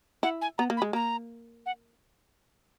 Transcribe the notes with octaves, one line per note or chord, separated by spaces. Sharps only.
E4 F#5
G#5
B3 A#5
A#3
B5
G#3
A#3 A#5
F#5